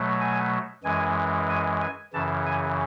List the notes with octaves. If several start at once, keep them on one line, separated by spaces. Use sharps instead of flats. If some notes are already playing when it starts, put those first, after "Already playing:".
Already playing: B2 F#3 A3
G#5
F#2 E3 G#3 G#5
G#5
G#5
F#2 C#3 E3 A5
G#5